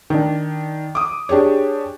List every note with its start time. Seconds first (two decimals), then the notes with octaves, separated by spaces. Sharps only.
0.10 D#3 D4
0.95 D6 D#6
1.29 D4 G4 G#4 C#5